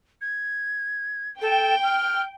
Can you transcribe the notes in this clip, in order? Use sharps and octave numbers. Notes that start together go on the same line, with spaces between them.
G#6
A4 G5
F6